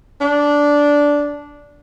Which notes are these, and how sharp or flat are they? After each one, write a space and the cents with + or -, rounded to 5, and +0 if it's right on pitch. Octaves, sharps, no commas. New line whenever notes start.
D4 -10